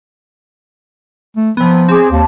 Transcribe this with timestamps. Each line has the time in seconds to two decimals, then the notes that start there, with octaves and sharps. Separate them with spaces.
1.36 A3
1.57 C3 F3 B3
1.89 C4 G#4 D6
2.11 D#2 A5